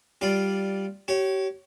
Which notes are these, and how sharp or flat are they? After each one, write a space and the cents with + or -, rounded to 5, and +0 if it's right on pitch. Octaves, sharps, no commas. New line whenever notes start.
G3 -10 F4 +0 D5 +0
G4 -35 C#5 +0